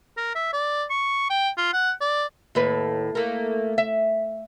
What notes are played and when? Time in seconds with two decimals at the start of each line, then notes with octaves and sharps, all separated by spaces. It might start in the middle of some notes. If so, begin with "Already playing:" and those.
0.17 A#4
0.35 E5
0.53 D5
0.90 C#6
1.30 G5
1.58 F4
1.73 F#5
2.01 D5
2.55 D#2 A2 B4
3.15 A3 A#3
3.78 E5